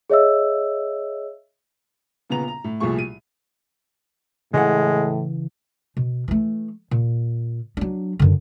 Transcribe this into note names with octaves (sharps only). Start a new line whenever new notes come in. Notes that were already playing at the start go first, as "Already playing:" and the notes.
G#4 C#5 D#5 E5 E6
A#2 C#3 B3 A#5 F7
A#5
A2
C2 A#2 F3 A3 G#4 C#6
D#7
A2 C#3 E3 G#3 F#5
B2
E3 A3
A#2
F#3 D4
F#2 D3